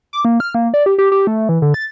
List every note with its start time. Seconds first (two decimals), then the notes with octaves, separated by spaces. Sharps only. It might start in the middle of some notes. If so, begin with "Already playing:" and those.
0.13 D6
0.25 A#3
0.40 F6
0.55 A#3
0.74 D5
0.86 G4
0.98 G4
1.12 G4
1.27 A3
1.49 E3
1.62 D3
1.74 A6